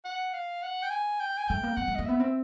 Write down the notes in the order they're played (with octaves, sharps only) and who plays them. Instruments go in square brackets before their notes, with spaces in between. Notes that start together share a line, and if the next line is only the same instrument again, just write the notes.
[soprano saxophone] F#5
F5
F#5
G5
G#5
G5
G#5
[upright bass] A3 [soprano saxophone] G5
[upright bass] A#3
[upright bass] B3 [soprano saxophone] F#5
[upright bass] A3
[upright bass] A#3 [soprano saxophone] D#5
[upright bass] B3 [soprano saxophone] E5
[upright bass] C4